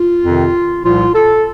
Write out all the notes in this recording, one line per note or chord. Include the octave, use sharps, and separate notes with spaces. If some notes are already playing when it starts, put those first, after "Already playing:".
Already playing: F4
F2 C3 D#3
C2 A#2 F3 F4
A4